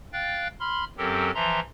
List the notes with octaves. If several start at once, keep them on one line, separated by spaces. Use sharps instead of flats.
F5 G5 F#6 A6
B5 C6 F6
F#2 F#3 C4 G4 A4 A#4
E3 F3 E5 A#5 C6